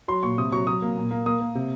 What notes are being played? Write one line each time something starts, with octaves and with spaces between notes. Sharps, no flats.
F#3 C6
A#2 C#6
C3 D#6
F#3 C#6
F#3 D#6
A#3
A#2
A#3
A#3 D#6
A#3
C3